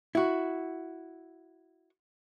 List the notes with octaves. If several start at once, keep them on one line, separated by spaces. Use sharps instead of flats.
E4 F#4